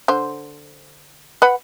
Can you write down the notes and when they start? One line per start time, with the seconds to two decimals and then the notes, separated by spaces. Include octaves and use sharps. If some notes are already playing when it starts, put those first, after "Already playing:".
0.08 D3 C5
1.42 B4 F#5 B5